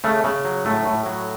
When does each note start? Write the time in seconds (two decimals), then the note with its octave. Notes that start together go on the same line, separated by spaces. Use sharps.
0.04 C#3 A3
0.24 C#3
0.45 F#3
0.65 A2 A3
0.86 A2
1.06 F#3